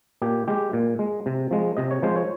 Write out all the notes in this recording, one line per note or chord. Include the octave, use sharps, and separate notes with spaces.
A#2 G4
G#3 G4
A#2
G#3
C3
F3 G#3
C3 D#5
C#5
F3 G#3 C5
C#5